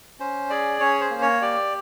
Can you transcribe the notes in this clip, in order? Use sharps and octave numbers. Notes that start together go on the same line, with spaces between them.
C#4 C5
G#4 D5
C#4 C#5
C5
A#3
C#5
G4 D5